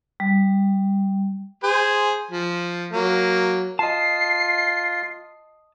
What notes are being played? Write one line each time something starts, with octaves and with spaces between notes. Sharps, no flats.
G3
G#4 C5
F3
F#3 A#3
F4 D#5 A5 C7